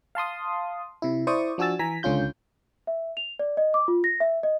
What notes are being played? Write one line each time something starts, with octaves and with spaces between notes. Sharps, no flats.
F5 A5 C6 D#6
C3 E4
E4 C5 D5 C#6 D#6
F3 D4 F#4 G#5 E6 A6
E3 G#5 A#5 B6
C#2 D3 C#4 F4 G6
E5
F7
D5
D#5
D6
F4
A#6
E5
D#5